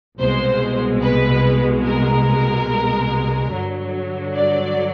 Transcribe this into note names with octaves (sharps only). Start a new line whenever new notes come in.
C2 B2 G#3 C5
B4
A#4
G2 D3 F#3
D5